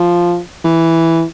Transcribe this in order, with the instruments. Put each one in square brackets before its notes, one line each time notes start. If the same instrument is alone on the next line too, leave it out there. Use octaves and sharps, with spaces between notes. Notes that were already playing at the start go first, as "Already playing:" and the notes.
Already playing: [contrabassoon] F3
E3